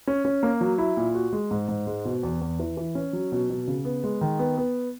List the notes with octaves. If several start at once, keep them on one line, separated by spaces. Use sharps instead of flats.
C#4
C#4
A#3
F#3
E4
A#2
F#4
G#3
G#2
G#2
G#3
B2
E2
E2
E3
E3
C#4
F#3
B2
B2
C#3
B3
G#3
D#3
B3
B3